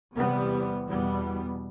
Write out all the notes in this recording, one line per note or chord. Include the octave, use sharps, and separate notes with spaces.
E2 C3 G3 B3
E2 B2 G3 B3